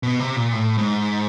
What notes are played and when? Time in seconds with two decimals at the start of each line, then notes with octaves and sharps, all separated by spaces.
0.03 B2
0.20 C3
0.36 A#2
0.52 A2
0.78 G#2